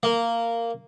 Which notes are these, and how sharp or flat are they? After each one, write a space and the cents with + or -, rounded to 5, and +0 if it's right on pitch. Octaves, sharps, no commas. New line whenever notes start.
A#3 -10